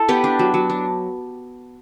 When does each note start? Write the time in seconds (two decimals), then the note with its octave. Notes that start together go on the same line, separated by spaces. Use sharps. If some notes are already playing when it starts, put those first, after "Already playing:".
Already playing: E4 A4
0.09 B3 G4 B4
0.24 D4
0.39 F#3
0.54 F#3
0.70 D4